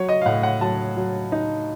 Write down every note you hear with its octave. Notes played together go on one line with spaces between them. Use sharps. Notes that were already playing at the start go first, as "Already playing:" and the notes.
Already playing: F#3 C#5
D#5
F5
A2 F#5
F#5
F#3 A5
F#3
D#4